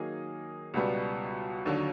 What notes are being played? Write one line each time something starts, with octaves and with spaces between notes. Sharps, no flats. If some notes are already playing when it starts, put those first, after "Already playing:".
Already playing: D#3 F#3 A#3 D#4 G#4
C#2 B2 G3 B3
D#2 D3 F#3